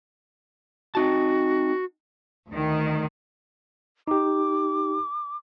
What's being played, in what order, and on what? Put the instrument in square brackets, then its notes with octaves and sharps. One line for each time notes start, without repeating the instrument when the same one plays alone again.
[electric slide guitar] C4 D#4 A5 [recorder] F#4
[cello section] D2 D#3
[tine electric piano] D#4 G4 [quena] D6